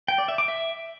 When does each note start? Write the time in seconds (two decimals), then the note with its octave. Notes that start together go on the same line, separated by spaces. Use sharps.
0.08 G5
0.18 D5
0.28 E5
0.38 D6
0.48 E5